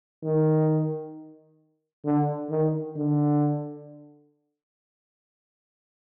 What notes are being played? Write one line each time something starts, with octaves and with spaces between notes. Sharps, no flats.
D#3
D3
D#3
D3